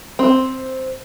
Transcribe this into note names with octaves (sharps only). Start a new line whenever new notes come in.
C4